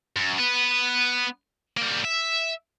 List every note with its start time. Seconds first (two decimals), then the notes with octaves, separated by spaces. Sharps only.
0.16 F#2
0.38 B3 B4
1.77 G3 A#3
2.05 E5